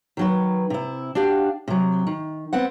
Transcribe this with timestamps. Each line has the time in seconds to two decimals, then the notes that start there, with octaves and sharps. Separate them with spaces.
0.17 D#3 F#3 B4
0.70 C3 E4
1.15 D4 F#4 G4 F5
1.68 C3 F#3
2.07 D#3
2.53 B3 C4 F#5